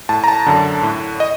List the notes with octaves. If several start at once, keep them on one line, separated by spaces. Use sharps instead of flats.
A2 A5
A#5
A5
F#2 D3
A2
D#5